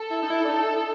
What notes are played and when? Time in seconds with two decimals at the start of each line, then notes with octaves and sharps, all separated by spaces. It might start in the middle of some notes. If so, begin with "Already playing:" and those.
Already playing: A4
0.10 E4
0.23 D#4
0.30 E4
0.45 D4
0.49 D#4
0.69 E4